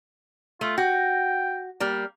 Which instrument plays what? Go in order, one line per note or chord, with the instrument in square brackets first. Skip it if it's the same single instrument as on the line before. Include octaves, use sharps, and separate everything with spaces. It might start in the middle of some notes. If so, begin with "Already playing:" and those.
[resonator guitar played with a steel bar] A3 [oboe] F4
[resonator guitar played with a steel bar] F#4 [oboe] G5
[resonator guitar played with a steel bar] G3 A#3